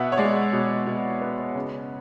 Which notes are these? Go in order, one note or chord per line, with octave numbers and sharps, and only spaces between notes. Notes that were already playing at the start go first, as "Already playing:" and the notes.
Already playing: B2 B3 E5 F#5
C#5
G#3 D5
B2
B2
B3
C#3